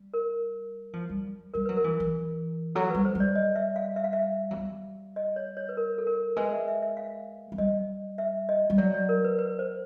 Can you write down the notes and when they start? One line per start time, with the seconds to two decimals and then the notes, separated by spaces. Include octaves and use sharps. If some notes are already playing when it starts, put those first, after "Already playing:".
Already playing: G3
0.14 A#4
0.93 F3
1.09 G3
1.54 G3 A#4
1.66 F#3 B4
1.77 A#4
1.84 E3
2.00 E3
2.75 F#3 A4
2.91 G3 B4
3.05 C5
3.15 G3
3.20 D5
3.35 D#5
3.55 E5
3.76 F5
3.96 E5
4.04 F5
4.13 E5
4.51 F#3
4.57 G3
5.16 D#5
5.36 C#5
5.57 C#5
5.69 B4
5.77 A#4
5.98 A4
6.07 A#4
6.36 G#3 B4
6.52 E5
6.68 E5
6.82 E5
6.97 F5
7.52 G#3
7.58 G3 D#5
8.18 E5
8.49 D#5
8.70 G3
8.78 F#3 D5
8.94 D5
9.09 A#4
9.24 B4
9.39 B4
9.59 C5